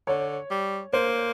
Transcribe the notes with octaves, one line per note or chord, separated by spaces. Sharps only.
D3 C#5
G3
A#3 C5